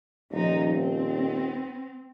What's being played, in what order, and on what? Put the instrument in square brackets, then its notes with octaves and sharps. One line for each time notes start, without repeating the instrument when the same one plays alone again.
[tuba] D#1 [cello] F3 D#4
[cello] C4